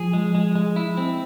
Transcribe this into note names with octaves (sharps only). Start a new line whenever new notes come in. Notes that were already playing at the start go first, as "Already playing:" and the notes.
Already playing: F3 G#4
G#3
G#3
G#3
E4
C4